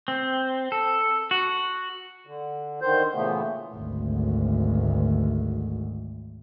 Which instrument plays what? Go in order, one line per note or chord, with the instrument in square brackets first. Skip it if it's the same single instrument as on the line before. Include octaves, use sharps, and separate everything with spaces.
[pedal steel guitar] C4
A4
[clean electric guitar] F#4
[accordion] D3
D3 D#3 C5 G6
A#2 C#3 E3 A3 B3
[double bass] G#1 D2